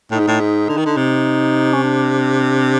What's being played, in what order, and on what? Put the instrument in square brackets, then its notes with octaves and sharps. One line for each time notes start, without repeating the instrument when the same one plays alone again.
[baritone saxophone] A2 [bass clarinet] D#4
[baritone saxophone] G#2
A2
G#2
D3
D#3
D3
C3
[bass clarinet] C#4
D4